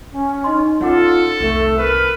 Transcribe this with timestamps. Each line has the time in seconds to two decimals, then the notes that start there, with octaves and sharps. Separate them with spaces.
0.12 C#4
0.44 D#4 D#5 C6
0.81 C#4 F4 A4 C#5 F#5 D6
1.41 C2 F2 A3
1.78 A#4 B4